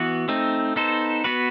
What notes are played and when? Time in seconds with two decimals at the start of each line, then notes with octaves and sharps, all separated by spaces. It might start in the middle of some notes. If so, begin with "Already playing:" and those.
Already playing: E3 B3 F#4
0.28 A3 C4 D#4
0.76 B3 D#4 A4 C5
1.24 B3 F#4 B4